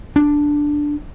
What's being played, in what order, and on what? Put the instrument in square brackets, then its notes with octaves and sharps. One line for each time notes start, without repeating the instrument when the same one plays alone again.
[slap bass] D4